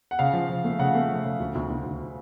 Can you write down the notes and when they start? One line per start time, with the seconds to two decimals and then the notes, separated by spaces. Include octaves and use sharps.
0.11 F#5
0.19 C#3 F5
0.33 F3
0.49 F3
0.64 A3
0.79 C#3 F#5
0.95 A3
1.10 F3
1.24 C#3
1.40 D2
1.55 D2
1.70 D2
1.86 D2